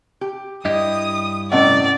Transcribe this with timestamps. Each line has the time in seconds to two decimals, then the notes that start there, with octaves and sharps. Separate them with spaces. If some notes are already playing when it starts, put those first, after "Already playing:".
0.21 G4
0.65 G2 E4 G4 D#5 D#6
1.52 A2 C3 C#4 D5 D#5 F#5